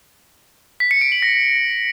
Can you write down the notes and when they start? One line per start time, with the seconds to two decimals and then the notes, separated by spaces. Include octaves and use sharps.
0.80 B6
0.91 C#7
1.01 D7
1.12 F#7
1.22 A#6